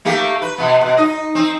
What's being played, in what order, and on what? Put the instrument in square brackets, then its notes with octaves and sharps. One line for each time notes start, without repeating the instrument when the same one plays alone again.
[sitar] A3 A#3 G4
B4
B2 B3
B2
D#4 D#5
C4 D#4